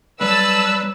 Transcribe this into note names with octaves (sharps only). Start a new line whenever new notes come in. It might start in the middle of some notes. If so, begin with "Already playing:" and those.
F#3 G3 B4 A5 E6